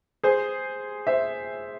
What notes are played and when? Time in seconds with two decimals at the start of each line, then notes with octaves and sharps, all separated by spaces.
0.23 G#4 C5
1.07 C5 E5